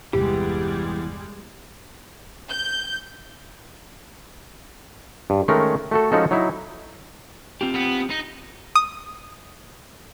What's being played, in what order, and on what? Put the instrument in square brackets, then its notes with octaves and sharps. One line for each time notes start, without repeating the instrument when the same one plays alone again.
[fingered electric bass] G1 E2 C3 [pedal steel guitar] E3 B3 [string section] G3 G#3 [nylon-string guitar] G4
[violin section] G6
[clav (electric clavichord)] G2
D#3 G#3 A3 C#4 A#4
A3 F#4 A4
F3 G#3 C#4 D#4 F#4 A4
F#3 D#4 E4
[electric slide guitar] C4 F4 G4
[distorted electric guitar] B3
D#4
[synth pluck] D#6